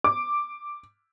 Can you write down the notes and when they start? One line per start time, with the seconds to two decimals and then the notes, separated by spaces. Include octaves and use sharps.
0.04 D6